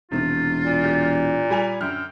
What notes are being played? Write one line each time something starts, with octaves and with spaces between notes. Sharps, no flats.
E1 C3 D#3 F4
A#2
G4
G3 G#5 F7
F#2 D3 G5 F6